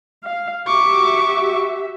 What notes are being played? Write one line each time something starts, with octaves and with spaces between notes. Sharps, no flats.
F5
F#4 G4 E5 C#6 D6